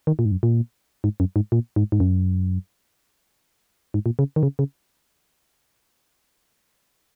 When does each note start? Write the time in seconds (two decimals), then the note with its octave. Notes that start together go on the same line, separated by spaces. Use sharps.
0.07 D#3
0.19 A#2
0.25 G#2
0.32 F#2
0.43 A#2
1.04 G#2
1.20 F#2
1.36 G#2
1.52 A#2
1.76 G#2
1.92 G#2
2.00 F#2
3.94 G#2
4.06 A#2
4.19 C#3
4.36 D#3
4.43 C#3
4.59 C#3